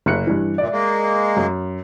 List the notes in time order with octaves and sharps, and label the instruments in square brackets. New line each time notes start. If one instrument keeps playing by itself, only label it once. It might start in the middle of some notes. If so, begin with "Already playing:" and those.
[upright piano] F#1 F#6 C#7
G2 E3
[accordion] A#2 [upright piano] D5 E5
[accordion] G#3 A#3
[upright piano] F#2